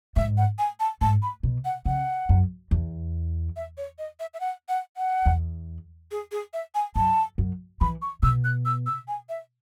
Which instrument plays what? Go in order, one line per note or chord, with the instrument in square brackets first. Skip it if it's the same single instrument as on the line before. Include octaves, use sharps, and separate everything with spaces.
[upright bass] G#2 [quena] E5
[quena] F#5
G#5
A5
[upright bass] G#2 [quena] A5
[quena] B5
[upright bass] B2
[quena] F#5
[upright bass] C#3 [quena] F#5
[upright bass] F#2
E2
[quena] E5
C#5
D#5
E5
E5
F#5
F#5
F#5
[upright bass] E2
[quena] G#4
G#4
E5
G#5
[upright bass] F#2 [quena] A5
[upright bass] F#2
[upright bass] E3 [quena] B5
[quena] C#6
[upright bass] B2 [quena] E6
[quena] F#6
E6
E6
G#5
E5